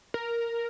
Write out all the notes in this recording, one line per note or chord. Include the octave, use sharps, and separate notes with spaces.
A#4